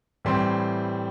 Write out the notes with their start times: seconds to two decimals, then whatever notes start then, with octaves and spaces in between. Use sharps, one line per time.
0.25 A2 E3 G3 C4 C6